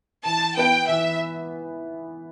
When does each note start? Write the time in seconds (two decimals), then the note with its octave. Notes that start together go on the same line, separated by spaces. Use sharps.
0.24 E3 A5
0.57 B3 E4 B4 G5
0.88 E3 E5